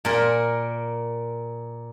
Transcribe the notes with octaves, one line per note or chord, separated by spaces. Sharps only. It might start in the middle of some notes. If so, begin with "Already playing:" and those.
A#2 A#4